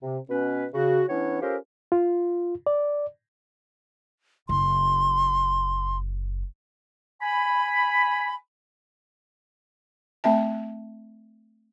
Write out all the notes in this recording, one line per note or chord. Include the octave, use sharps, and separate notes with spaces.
C3
B2 C#4 B4
C#3 F#4
E3 B3 C#4 D4 E4 C#5
C#4 F4 G4 A4 A#4 C5
F4
D5
F#1 C6
G#5 B5
A3 C4 E5 A5